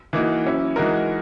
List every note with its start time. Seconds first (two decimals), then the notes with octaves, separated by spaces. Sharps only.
0.13 E3 A#3 D#4 F#4
0.45 F#3 C#4 E4
0.76 E3 G#3 D#4 F#4 A#4